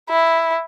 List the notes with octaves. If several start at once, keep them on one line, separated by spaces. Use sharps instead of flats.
E4